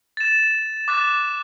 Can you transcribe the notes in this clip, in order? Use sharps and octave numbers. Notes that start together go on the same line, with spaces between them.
A6 E7
D6 F#6 A6